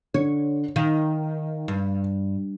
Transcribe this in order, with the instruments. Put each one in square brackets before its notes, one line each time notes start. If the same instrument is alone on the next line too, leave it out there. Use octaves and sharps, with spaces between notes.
[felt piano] D3 [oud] C#5
[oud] D#3 [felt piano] F5
[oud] G2